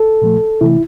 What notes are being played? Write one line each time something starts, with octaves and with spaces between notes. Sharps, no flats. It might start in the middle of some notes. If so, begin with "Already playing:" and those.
Already playing: A4
A#2 F3 A3
C3 E3 A3 E4